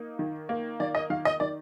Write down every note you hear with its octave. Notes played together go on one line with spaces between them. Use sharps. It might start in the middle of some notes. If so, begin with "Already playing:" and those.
Already playing: A#3 D#4
D#3
A#3
D#3 D5
D#5
D#3 F5
D#5
D#3 D5